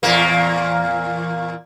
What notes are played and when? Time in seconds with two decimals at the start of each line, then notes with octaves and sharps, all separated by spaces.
0.03 E2 A#2 A#3